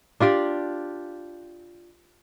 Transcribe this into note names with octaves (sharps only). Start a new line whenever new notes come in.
D4 F4 G4 D5